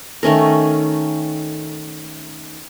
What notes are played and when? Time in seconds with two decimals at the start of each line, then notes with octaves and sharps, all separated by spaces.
0.23 D#3 A3 C#4 A#4